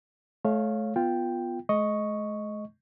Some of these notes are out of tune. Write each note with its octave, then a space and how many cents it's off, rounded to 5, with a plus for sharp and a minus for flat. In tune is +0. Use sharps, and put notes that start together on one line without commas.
A3 -30 C#5 -5 F5 +0
B3 +0 F4 +0 G5 +0
G#3 +45 D#5 +5 C#6 +0